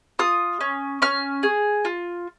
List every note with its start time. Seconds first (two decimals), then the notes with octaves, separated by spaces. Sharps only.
0.19 F4 D#6
0.61 C#4
1.02 C#4 F6
1.43 G#4
1.85 F4